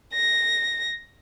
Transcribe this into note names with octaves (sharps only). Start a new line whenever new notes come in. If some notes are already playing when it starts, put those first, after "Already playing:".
A#6